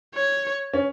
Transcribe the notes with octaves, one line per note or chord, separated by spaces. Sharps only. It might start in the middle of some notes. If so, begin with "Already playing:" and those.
C#5
C#4